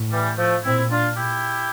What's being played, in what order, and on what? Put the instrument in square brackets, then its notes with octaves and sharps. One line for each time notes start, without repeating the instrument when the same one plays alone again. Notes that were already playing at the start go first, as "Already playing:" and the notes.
Already playing: [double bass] A2
[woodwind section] E3 G3
F3 A3
[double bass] A#2 [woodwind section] C4 E4
[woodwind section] D4 F4
E4 G4